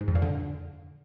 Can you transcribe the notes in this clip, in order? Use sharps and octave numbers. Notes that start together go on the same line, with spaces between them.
G#2
F2
A#2
D3